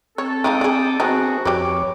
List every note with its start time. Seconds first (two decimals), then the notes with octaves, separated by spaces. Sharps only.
0.18 C4 A4 C#5
0.44 G#3 D#4 F4 G5 D6 D#6
0.61 G#4 D5
1.00 D#3 B3 C4 D4 F#4 G#4
1.45 F2 G3 B4 C#5 D6